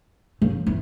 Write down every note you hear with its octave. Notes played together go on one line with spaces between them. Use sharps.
C#3
E3